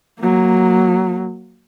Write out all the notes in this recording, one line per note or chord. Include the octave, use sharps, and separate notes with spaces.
F#3 A#3